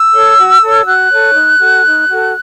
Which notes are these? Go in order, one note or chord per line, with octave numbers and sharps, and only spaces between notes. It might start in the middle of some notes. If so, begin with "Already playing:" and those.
Already playing: E6
A4 C#5
F#4
A4 C#5
F#4 F#6
A4 C#5
D#4
F#4 A4
D#4
F#4 A4